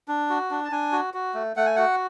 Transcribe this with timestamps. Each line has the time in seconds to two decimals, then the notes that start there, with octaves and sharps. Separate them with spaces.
0.08 D4
0.30 F#4
0.51 D4
0.64 A5
0.72 D4 G#5
0.92 F#4
1.14 F#4
1.34 A3
1.56 A3 F#5
1.66 G#5
1.76 F#4 F#5